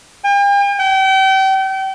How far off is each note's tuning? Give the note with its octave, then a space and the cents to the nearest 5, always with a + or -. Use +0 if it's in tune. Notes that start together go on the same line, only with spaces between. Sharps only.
G5 +45
G5 -35